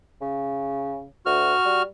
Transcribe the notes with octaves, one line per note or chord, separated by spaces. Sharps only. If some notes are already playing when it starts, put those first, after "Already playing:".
C#3
D2 F#4 F6
G3